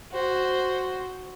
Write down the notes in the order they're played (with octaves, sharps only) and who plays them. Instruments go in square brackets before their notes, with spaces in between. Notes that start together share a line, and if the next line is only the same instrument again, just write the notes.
[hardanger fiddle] F#4 C5